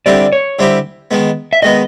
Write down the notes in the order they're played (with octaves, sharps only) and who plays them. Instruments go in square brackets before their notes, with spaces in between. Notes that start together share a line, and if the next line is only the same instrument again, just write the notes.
[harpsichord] D3 G3 C4 E4 G4 [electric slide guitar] D5
[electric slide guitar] C#5
[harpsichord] D3 G3 C4 E4 G4
D#3 G#3 B3
[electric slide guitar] E5
[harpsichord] D#3 G#3 B3 [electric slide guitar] D#5